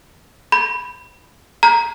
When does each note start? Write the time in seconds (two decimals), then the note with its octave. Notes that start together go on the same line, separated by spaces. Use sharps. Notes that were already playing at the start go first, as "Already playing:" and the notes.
0.52 B5
1.63 A#5